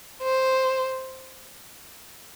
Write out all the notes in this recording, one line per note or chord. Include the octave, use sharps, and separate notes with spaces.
C5